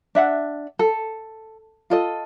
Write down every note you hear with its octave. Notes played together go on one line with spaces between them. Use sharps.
D4 E5 F#5
A4
F4 A4 D#5